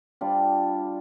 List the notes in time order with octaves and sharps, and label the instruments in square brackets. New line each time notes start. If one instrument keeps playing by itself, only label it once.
[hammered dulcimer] G3 D4 F4